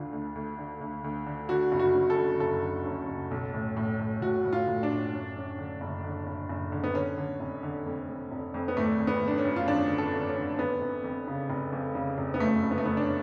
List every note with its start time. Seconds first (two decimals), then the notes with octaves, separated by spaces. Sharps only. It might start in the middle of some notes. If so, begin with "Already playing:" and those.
Already playing: D2 D3 F4
0.13 D2
0.35 D2
0.59 D3
0.81 D2
1.04 D2
1.27 D3
1.49 D3 F#4
1.72 F#1
1.79 F#4
1.95 F#2
2.10 A4
2.17 D3
2.40 F#1 A4
2.63 D3
2.85 F#2
3.08 F#1
3.31 B1
3.54 A2
3.77 A2
3.99 A2
4.22 A2 F#4
4.45 A2
4.53 F4
4.68 A2
4.83 D4
4.90 A2
5.13 F#2
5.36 F#2
5.59 D3
5.81 F#1
6.04 D3
6.27 F#1
6.49 F#1
6.72 D3
6.84 B3
6.95 D3 C#4
7.18 D3
7.40 F1
7.63 D3
7.86 F2
8.08 F2
8.32 F1
8.54 F2
8.68 B3
8.77 G#1 A3
8.99 G#1
9.07 B3
9.22 G#1
9.28 D4
9.38 C#4
9.45 F#2
9.56 F4
9.68 G#1 D4
9.90 D3
9.98 A4
10.13 G#1
10.28 C#4
10.36 D3
10.59 F2 B3
10.82 F1
11.04 F2
11.27 C#3
11.50 F1
11.73 F2
11.95 C#3
12.18 F1
12.34 B3
12.40 F#2 A3
12.63 F#1
12.71 B3
12.78 A3
12.85 F#1 B3
12.97 D4
13.01 C#4